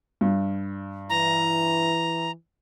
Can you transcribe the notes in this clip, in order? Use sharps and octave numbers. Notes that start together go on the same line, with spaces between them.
G2
E3 A#5